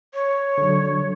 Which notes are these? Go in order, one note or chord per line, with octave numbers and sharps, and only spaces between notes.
C#5
D3 F#3